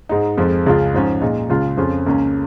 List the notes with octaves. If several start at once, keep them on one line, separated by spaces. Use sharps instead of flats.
G#2 G#3 D#4
F2 F3 G#3
C#2 C#3 G#3 F4
G#2 F3 C#4
A#2 G#3 D#4
C#2 C#3 G#3 F4
F2 C#3 F3 C#4 F4
C#2 C#3 A#3 C#4